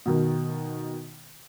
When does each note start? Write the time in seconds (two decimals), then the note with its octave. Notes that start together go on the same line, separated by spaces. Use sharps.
0.06 B2 D#3